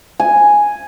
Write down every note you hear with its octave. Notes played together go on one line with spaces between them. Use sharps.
G#5